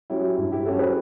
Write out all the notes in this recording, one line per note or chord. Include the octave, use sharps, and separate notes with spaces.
F#3 C#4 E4 G4
G2 E4
E4 G4
F#3 C#4 F#4 A4
G4 B4